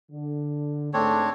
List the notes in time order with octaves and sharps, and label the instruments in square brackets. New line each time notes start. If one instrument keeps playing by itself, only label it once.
[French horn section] D3
[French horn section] G#2 A3 [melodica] C4 D4 C#5